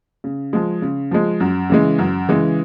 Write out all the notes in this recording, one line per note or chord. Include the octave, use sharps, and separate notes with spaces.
C#3
F3 G#3
C#3
F3 G#3
F#2
C#3 E3 G#3
F#2
C#3 E3 G#3